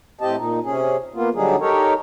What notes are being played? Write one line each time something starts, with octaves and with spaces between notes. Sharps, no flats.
A2 C4 G4 D#5 A5
A#2 D#4
C3 C#4 G#4
A#3 B3 F4
D3 F#3 G3 D4 D#4 G#4
D#4 G4 A4 A#4 C#5